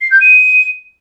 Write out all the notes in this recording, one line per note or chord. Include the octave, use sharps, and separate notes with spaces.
C7
G6
D#7